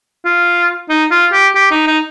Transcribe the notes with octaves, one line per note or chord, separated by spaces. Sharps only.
F4
D#4
F4
G4
G4
D#4
D#4